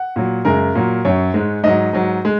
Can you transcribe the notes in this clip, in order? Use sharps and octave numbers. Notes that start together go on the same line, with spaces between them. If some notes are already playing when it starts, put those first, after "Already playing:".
Already playing: F#5
A#2 F#3
F#2 C#3 G#3 A#4
A#2 F#3
F#2 F#3 C#5
G#2 G#3
G#2 F#3 D#5
G#2 F#3
G#3